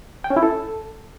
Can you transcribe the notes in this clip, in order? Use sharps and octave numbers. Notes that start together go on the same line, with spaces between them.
G5
C#4
E4
A4